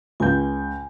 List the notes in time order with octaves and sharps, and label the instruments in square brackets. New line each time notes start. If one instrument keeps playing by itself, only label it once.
[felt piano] C#2 G6 [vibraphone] G#5